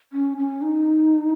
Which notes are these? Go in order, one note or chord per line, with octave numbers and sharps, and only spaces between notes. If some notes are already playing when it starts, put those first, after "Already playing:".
C#4
C#4
D#4